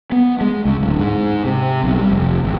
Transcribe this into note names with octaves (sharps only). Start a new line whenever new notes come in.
B3
G#3
C#2
D1
G#2
C3
B1
G3
F1
G#1